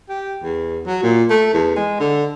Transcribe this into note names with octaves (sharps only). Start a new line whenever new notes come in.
G4
E2
F#3
A#2
A3
E2
G#3
D3